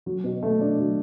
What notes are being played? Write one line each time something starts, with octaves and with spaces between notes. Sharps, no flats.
F#3
B2
A3
D4
F#3